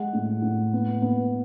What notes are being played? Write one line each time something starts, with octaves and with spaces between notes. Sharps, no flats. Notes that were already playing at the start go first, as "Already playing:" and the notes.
Already playing: G#3 F#5
A2
A2
B3
B3